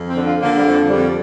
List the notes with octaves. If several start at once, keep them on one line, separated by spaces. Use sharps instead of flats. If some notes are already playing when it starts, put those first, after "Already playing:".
Already playing: F2
C4
D3
F4
D3 A#3
G3
F2
F2 G3